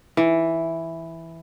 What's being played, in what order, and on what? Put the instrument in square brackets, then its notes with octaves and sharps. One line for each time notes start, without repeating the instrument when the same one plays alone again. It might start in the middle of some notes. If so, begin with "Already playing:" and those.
[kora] E3